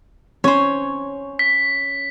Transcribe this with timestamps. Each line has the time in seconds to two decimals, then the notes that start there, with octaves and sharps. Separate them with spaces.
0.44 C#4 C5 C#5
1.39 B6